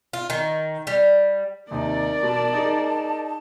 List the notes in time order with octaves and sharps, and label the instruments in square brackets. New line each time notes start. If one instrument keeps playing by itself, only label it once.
[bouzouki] F4
D#3
G3
[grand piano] D#2 C3 D#4 [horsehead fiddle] A#4 D5
[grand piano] B2 [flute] A5
[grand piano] D#4 G#4